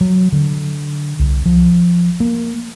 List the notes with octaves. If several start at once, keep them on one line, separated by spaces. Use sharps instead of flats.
F#3
D3
C2
F3
A#3